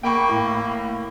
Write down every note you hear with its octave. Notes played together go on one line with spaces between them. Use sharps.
A#3 G5 B5 C#6
A2